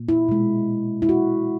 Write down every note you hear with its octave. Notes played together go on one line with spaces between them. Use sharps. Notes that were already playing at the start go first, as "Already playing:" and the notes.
Already playing: A#2
E4
B2 G#3
E4
F#4